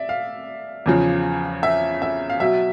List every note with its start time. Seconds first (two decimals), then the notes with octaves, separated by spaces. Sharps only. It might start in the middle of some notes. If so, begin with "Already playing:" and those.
Already playing: D5 E5
0.09 F5
0.86 E2 C#3 F3
1.63 E5
2.02 E5
2.30 F5
2.40 B2 F#3 E5